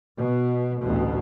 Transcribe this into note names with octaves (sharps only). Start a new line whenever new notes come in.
B2
A1 D2 B2